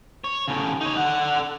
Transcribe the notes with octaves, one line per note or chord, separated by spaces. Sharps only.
C#5
A2 C#3
D#4 C#5
D3 F#5